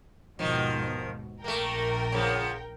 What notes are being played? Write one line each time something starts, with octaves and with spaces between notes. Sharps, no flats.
D#2 G#2 B2 D#3 F3
A#1 A3 A#3 A#4 G5
C#3 F3 B3